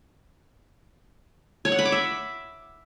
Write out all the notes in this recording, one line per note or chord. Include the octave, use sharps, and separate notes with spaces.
C#5
F#5
B5
D6
E5